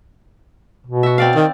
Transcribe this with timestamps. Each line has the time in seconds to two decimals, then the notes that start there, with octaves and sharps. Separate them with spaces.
0.87 B2
1.03 F#4 E5
1.18 C4 D5 F5
1.36 D#3